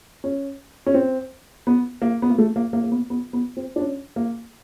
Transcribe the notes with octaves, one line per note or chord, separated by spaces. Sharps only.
C#4
C#4
C4
B3
A#3
B3
A#3
A3
A#3
A#3
A#3
B3
B3
B3
C4
D4
C#4
A#3